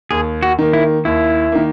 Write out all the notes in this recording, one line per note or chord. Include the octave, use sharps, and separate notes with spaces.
D#2 G#4
F#4
D#3 A#3
E4
D#2 E4
D#3 A#3